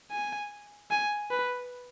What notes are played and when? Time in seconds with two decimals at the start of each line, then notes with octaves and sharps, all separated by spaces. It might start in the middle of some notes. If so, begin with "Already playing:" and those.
0.12 G#5
0.91 G#5
1.31 B4